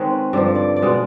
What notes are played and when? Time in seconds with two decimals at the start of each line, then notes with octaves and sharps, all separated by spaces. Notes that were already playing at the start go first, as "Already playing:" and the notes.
Already playing: D#3 G#3 C4 B4 C#5
0.33 G2 D3 F3 D5
0.55 D5
0.76 D5
0.82 B2 G#3 B3